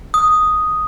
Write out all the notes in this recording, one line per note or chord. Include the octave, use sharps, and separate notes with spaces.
D#6